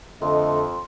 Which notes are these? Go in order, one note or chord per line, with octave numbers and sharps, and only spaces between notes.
F2 D3 A3 D#5 C6